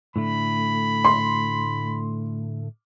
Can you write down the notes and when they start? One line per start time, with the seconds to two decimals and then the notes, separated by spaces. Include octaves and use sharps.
0.16 A2 D3 A3 B5
1.05 C6